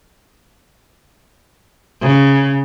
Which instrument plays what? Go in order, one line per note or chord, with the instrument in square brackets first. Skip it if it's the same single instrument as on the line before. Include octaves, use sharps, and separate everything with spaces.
[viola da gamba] C#3